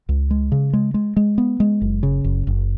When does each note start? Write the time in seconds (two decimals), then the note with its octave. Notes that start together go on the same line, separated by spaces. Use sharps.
0.09 C#2
0.31 G#3
0.52 C#3
0.73 G#3
0.94 G#3
1.17 G#3
1.38 B3
1.60 G#3
1.82 F#1
2.03 C#3
2.24 F#1
2.47 F#1